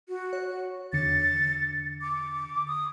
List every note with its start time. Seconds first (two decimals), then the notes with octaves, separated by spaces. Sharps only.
0.08 F#4
0.33 C#5
0.93 E2 D3 A6 C#7
2.01 D6
2.68 D#6